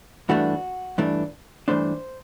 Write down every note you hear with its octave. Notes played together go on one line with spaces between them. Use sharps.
G2 E3 A3 D4 F#4
G2 E3 A3 D4
G2 E3 A3 D4 C5